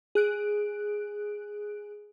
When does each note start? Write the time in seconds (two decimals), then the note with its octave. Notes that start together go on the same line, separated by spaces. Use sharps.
0.15 G#4 F#6 D7